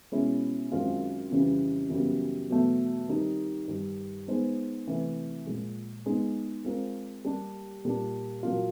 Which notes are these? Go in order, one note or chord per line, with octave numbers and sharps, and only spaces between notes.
B2 G#3 C#4 E4 G#4
F#2 D#3 G#3 C4 F4
F2 C#3 E3 G3
F#2 C#3 E3 G3 B3
E2 B2 F#3 A3
D#3 G3 C4 D#4
G2 D#3 G3
G#3 B3 D#4 G#4 C5
C3 E3 A3
A#2 F3 G#3
G#3 B3 D#4
G#3 C4 F4 A#4
G3 A#3 D4 G4
A#2 G3 A#3 D4
A#2 F#3 A#3 D4 F4